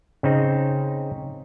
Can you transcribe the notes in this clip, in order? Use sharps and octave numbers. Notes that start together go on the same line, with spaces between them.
C#3 C4 D#4